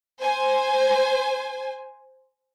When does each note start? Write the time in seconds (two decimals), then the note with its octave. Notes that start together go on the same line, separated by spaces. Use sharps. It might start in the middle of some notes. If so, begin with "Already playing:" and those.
0.20 C5 G#5